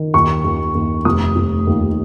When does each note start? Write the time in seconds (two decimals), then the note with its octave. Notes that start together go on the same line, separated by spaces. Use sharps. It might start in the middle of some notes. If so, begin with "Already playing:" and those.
Already playing: D#3
0.14 D#2 C#6
0.44 D#2
0.75 D#2
1.05 F1 D#6
1.36 F1
1.67 D#2